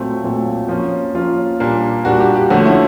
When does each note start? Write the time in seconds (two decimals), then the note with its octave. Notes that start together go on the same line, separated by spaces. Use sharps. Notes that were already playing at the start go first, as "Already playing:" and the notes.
Already playing: A#2 F#3 A3 C4
0.24 A#2 F#3 A3 C4
0.69 F3 A#3 C#4
1.15 F3 A#3 C#4 F4
1.60 A#2 G3 A#3 D4
2.05 A#2 G3 A#3 D4 F#4
2.20 G4
2.35 G4
2.50 D3 F3 A3 C#4 F#4
2.66 E4